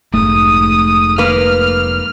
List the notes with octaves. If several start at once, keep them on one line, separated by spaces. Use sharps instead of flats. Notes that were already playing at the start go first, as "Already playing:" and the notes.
F1 G#2 A3 D#6
A#3 B4 F6